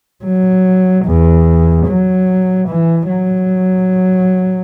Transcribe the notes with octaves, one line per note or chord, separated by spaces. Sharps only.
F#3
E2
F#3
E3
F#3